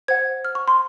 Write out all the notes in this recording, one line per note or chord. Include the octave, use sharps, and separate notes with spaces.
C5 F#5 G#6
F6
C#6
C6